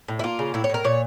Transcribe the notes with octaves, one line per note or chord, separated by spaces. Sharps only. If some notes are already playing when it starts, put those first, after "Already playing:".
A2
E4
A#3 F4
C#3
A2 E4
C#5
A2 A#4
A#2 C#5